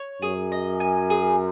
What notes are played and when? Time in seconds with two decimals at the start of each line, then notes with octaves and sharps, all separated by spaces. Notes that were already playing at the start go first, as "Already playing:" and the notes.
Already playing: C#5
0.22 F#2 G#4
0.52 D#5
0.80 G#5
1.10 G#4